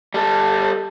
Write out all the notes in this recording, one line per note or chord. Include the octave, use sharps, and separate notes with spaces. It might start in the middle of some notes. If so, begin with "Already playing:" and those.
G3 A4